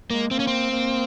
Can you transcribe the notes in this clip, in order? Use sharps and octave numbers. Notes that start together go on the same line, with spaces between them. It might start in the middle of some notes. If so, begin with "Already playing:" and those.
G#3 A#3
A#3 C4
C#4
C4
A#3